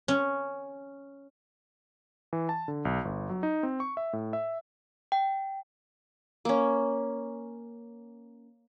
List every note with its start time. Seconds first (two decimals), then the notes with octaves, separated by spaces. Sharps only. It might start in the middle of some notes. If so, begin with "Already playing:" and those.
0.08 C#4
2.33 E3
2.49 A5
2.68 D3
2.85 B1
3.05 G1
3.29 F#3
3.43 D#4
3.63 C4
3.80 C#6
3.97 E5
4.13 A2
4.33 E5
5.12 G5
6.45 A#3 C#4